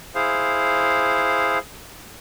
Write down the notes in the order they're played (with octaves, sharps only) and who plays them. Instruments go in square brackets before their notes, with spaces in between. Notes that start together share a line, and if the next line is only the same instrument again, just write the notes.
[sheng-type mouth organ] E4 G#4 C5 F5